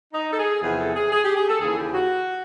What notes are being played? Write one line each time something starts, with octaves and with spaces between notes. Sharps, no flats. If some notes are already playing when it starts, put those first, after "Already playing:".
D#4
A4
G#4
E2 C3 F3 G#4
A4
G#4
G#4
G4
G#4
A4
D#2 C#3 E3 G#4
G4
F#4